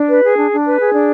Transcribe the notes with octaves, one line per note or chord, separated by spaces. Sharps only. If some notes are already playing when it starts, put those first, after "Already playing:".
Already playing: D4
B4
G#4
D4
D4
B4
G#4
D4